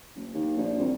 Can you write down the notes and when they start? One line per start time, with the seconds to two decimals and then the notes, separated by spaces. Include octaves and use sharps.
0.16 F#1
0.34 D#2
0.57 A#1
0.78 C2